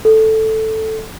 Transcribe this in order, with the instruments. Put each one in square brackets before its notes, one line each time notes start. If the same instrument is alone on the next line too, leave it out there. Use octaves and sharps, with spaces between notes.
[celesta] A4